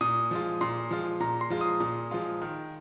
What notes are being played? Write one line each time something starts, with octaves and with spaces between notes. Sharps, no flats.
A#2 D#6
F3 G#3 F4
A#2 C6
F3 G#3 F4
A#2 A#5
C6
F3 G#3 F4
D#6
A#2
F3 G#3 F4
D#3